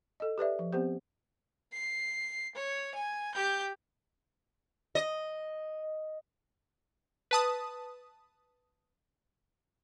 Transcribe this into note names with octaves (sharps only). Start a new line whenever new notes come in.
A4 D#5
G4 B4 D5 E5
F3
B3 C4 G4 C5
C7
C#5
G#5
G4 G6
D#5
B4 A5 D#6